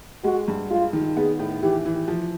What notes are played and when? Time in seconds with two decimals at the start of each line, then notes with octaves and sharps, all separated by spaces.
0.24 G#3 F#4
0.48 G2
0.70 G#3 F4
0.93 D#3
1.17 B3 G#4
1.39 A2
1.62 E3 G4
1.85 E3
2.08 F3